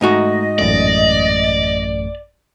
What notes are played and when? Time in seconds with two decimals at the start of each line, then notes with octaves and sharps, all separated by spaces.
0.01 G#2 A3 D#4 F#4 D#5
0.59 A1 F#2 A3 D5